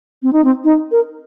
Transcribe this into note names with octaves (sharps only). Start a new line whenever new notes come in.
C4
D#4
C4
D#4
A#4